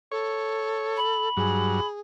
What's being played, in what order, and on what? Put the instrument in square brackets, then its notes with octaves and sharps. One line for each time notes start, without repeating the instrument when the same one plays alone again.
[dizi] A4 [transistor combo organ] C#5
[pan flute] B5
[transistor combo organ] G2 F#3 [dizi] G#4